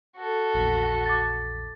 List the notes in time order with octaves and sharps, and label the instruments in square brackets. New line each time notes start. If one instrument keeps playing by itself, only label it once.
[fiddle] F#4 A4
[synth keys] A#1 E2 B6
[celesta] D6 A6